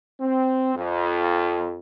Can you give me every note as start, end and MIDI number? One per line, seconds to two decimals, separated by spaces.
0.20 0.73 60
0.75 1.78 41